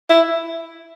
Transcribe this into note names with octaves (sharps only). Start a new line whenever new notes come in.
E4